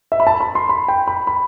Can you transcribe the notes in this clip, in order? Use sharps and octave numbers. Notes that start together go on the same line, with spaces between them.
E5
B5
A5
B5
C6
B5
G5
B5
B5